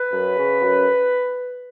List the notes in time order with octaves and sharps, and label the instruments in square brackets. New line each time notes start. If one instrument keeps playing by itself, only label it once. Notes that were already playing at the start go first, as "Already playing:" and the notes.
Already playing: [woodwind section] B4
F#2
C#3
F#2